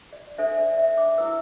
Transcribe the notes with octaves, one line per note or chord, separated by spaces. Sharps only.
D5
D4 A4 C5 E5
D5
E5
D6
E4 B4 E6